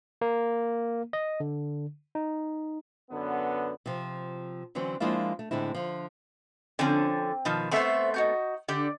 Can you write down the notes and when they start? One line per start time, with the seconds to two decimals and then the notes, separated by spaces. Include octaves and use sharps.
0.21 A#3
1.13 D#5
1.40 D3
2.15 D#4
3.11 F#2 D3 B3
3.86 C3 F3
4.75 D3 E3 F#3 C4 C#4
5.00 F3 G#3 A#3 D4 E4 F4
5.39 A3
5.51 A2 D3 G#3 C4 E4
5.75 D3 F3
6.79 D3 F3 C4 C#4
7.45 B2 D#3 F3
7.71 A3 B3 C4 C5 E5 C#6
8.14 D#4 F#4 G6
8.68 D3 G4 D5